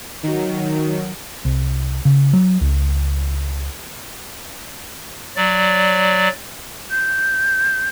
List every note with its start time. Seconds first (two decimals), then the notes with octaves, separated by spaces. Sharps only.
0.23 D#3 F#3
1.45 C2
2.05 C#3
2.33 F#3
2.61 C#2
5.36 F#3 D5
6.91 G6